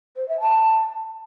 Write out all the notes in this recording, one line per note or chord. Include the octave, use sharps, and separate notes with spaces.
C5
E5
A5